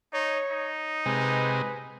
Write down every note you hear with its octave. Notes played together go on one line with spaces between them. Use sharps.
D#4 C#5
D#4
C3 G#3 B4